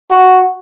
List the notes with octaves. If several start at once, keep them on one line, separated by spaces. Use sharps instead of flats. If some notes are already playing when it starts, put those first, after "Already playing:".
F#4